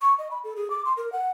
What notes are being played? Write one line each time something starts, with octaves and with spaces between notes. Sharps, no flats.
C#6
D#5
B5
A4
G#4
D6
C6
A#4
F#5